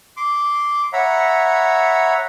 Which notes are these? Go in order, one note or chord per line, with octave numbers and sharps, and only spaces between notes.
C6 D6
C#5 E5 F#5 A#5 B5